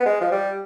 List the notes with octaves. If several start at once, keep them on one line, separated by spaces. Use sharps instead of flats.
B3
G#3
F3
G3